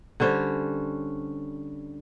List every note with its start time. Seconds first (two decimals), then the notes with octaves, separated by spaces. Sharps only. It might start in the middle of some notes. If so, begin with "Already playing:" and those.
0.20 D3 G3 C#4 C5